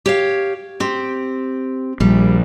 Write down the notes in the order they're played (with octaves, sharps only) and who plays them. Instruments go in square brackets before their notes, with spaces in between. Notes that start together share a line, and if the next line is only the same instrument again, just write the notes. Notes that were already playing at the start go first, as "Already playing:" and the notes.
[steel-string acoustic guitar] G4 C#5 F5
C4 G4
[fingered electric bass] A#1 [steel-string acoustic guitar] G3